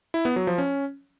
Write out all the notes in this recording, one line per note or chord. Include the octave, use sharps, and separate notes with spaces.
E4
B3
F#3
F3
C#4